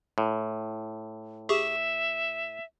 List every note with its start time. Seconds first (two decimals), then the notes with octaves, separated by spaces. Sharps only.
0.18 A2
1.49 G4 G#4 E5 C#6